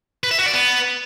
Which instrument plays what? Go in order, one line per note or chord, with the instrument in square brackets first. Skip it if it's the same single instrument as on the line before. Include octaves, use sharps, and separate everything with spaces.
[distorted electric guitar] B4
E5
F#4
D5
B3